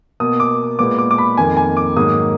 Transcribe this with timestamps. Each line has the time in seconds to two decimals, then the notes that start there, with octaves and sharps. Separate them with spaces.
0.20 B2 A#3 D#6
0.40 D6
0.79 A#2 G#3 B3 D6
0.98 D6
1.11 D6
1.18 B5
1.37 F2 D#3 A#3 G#5
1.57 G#5
1.77 D6
1.96 G#2 D#3 F#3 A#3 D#6